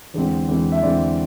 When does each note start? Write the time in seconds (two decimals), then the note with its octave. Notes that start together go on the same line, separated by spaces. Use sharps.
0.14 E2 D3 G#3 C4
0.48 E2 D3 G#3 C4
0.72 E5
0.82 E2 D3 G#3 C4 D5